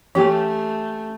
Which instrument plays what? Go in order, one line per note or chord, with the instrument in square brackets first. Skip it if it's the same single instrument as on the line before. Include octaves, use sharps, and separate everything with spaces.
[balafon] E3 [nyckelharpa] A3 [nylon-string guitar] C#4 G4